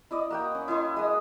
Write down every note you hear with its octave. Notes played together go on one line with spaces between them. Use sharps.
E4 D5 D#5
A#3 F#4 G5
C#4
E4 D#5 C6
G#3 D#6